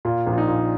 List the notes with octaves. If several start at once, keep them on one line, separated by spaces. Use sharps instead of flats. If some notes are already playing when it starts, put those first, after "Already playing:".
A#2 F4
A#1
F4
D#4
A#2